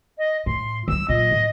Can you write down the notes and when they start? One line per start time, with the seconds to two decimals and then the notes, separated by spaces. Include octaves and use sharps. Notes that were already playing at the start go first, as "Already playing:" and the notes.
0.18 D#5
0.46 A2 C6
0.88 F3 F#3 E6
1.08 A#2 F#3 D#5
1.31 A2